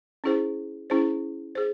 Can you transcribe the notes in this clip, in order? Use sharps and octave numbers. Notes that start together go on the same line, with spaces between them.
C#4 E4 G#4 C5
C#4 E4 G#4 C5
G#4 C5